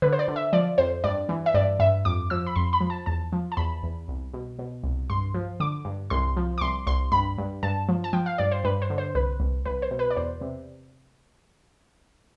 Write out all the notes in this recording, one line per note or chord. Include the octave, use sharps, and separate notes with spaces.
D3 B4
C5
D5
D3
E5
F3 D5
F2 C5
G2 D5
E3
E5
G2 D5
G2 E5
F2 D6
F3 E6
B5
F2 C6
B5
F3
A5
E2 A5
F3
A5
E2 B5
E2
C2
B2
B2
C2
G2 C6
F3
D3 D6
G2
C2 C6
F3
D6
C2 C6
C2 C6
G2 B5
G2
G2 A5
F3
A5
F3 G5
F5
G2 D5
C5
G2 B4
C5
D3
C5
C2 B4
C2
C2 B4
C5
B2
B4
D5
E2 C5
C3